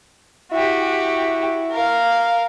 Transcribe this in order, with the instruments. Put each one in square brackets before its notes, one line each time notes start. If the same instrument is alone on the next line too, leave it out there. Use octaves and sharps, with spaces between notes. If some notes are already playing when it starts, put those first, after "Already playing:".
[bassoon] E4 [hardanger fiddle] F#4 G4
[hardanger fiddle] A#4 F5